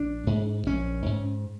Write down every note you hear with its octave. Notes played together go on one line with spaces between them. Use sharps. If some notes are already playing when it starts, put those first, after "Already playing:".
Already playing: A#1 D4
G#2
A#1 C#4
G#2